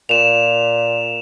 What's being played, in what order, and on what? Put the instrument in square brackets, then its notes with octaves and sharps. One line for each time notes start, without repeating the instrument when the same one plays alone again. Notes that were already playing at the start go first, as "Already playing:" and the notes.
[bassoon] A#2 [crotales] E7 F7